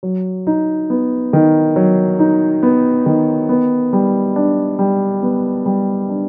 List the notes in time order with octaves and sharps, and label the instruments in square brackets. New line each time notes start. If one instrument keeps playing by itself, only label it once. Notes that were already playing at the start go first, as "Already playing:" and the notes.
[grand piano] F#3
D#4
B3
D#3
F#3
D#4
B3
D#3
B3
G3
D4
G3
B3
G3
D4